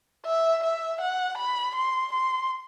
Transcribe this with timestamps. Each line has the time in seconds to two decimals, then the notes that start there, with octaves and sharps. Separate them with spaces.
0.26 E5
0.64 E5
1.01 F#5
1.38 B5
1.75 C6
2.13 C6